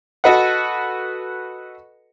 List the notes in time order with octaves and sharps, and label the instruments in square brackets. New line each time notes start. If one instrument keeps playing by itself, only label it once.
[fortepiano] F#4 A4 B4 D#5 F#5